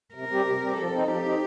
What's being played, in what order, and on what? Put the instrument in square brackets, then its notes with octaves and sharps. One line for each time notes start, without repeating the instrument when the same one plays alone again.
[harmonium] C3 [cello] A#4
[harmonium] G3 C4 G4
C3
G3 C4 G4
[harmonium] F3 [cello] A4
[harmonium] C4 D#4
[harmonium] F3 [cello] G4
[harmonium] C4 D#4